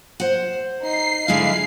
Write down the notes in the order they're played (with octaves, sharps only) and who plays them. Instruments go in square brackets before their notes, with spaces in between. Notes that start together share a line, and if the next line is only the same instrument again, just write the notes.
[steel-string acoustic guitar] C5 F#5
[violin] D#4 [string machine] C7
[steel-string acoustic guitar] D3 G#3 E4 [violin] F5